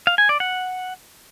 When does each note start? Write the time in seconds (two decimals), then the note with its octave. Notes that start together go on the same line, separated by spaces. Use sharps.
0.07 F5
0.18 G#5
0.29 D5
0.40 F#5